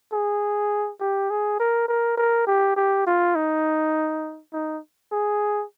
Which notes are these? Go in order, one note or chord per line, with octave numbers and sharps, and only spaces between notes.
G#4
G4
G#4
A#4
A#4
A#4
G4
G4
F4
D#4
D#4
G#4